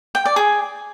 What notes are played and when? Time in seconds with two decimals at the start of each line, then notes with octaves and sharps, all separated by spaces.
0.15 G5
0.25 D5
0.36 G#4